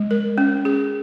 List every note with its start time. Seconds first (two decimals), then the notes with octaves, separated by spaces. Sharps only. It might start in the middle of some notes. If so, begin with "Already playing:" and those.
Already playing: G#3
0.11 A#4
0.38 C#4
0.65 G#4